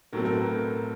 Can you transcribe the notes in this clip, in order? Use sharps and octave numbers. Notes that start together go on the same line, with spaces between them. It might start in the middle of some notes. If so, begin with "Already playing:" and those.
A2 F#3 A3 C4 A#4
A#4
B4
A#4